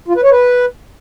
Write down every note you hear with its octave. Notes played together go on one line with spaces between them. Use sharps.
F4
B4
C#5
B4